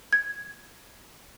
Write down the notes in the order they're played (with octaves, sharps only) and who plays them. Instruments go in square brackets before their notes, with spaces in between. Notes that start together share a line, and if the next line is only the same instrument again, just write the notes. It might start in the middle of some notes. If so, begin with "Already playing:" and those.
[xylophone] G#6